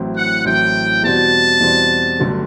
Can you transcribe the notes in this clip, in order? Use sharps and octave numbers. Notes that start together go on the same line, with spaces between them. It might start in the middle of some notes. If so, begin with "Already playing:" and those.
Already playing: A1 A2 F#3 C4 E4
F#5
A1 A2 F#3 C4 E4 G5
E2 B2 G3 C4 F#4 A5
E2 B2 G3 C4 F#4
G1 G2 D3 F#3 A3